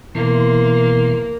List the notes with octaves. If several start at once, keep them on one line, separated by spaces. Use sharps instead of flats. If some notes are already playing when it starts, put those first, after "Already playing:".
B2 E3 A#3 C6